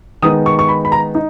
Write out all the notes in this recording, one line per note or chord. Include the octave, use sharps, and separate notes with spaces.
D#3 G#3 B3 D#4 D#6
C#6
C#6
B5
B5
A#5
D#4